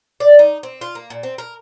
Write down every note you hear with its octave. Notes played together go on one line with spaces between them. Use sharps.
D5
D#4
C4
F4
A#3
A#2
C4
A#4